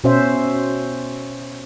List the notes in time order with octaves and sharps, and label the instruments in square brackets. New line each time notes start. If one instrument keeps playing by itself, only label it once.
[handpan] B2 C#4 C5 E5